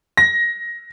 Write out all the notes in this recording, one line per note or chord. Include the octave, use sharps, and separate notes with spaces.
A#6